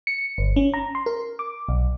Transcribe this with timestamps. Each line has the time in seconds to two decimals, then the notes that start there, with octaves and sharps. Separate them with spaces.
0.07 C#7
0.38 G1
0.56 C#4
0.74 A#5
0.95 C6
1.06 A#4
1.39 D6
1.69 B1